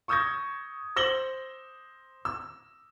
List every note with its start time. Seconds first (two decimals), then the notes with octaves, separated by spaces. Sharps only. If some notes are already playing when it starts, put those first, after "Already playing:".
0.08 C#6 D#6 E6 G6 G#6 A#6
0.96 C5 E6 A#6 F#7 G7
2.25 E6